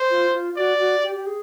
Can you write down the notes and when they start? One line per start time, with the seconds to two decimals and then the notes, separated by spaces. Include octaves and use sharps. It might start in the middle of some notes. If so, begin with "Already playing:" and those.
Already playing: C5
0.10 F4
0.34 F4
0.56 F#4 D5
0.79 F#4
1.03 G4
1.15 G4
1.26 G#4